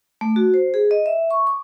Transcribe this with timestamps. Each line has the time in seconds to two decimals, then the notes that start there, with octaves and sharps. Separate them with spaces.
0.21 A3
0.36 F#4
0.54 C5
0.74 G#4
0.91 D#5
1.06 E5
1.31 C#6
1.47 D6